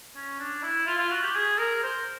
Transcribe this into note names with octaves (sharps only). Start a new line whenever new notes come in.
C#4
D4
E4
F4
F4
F#4
G4
G#4
A#4
C5